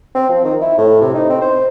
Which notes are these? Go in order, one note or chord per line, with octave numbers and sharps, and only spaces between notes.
C4
F3
D#3
E4
A2
C3
D#4
C4
C5